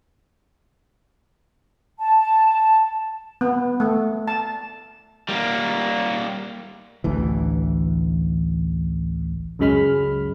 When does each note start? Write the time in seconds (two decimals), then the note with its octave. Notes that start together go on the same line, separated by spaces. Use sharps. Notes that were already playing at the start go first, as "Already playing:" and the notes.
1.99 A5
3.41 B3
3.80 A3
4.28 A5
5.29 G3 A#3
7.04 A1 D2 E3
9.59 C#2 F#2 C#3 G#3 B5 F6